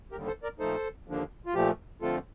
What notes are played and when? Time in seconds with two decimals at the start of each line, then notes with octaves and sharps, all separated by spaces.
0.12 D#2 D3 G3 G4 A#4
0.27 A4 C5
0.43 A#4 D5
0.59 A#2 F3 A3 D#4 A4 C5
1.08 D#2 D3 F3 A#3 D4
1.46 F4
1.54 A#2 F3 A3 G4
2.02 D3 F3 A3 C4 F4 A4